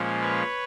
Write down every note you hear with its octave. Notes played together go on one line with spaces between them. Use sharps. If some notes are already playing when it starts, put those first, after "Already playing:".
Already playing: A#2 F3 G#3 C#4
B4 C#5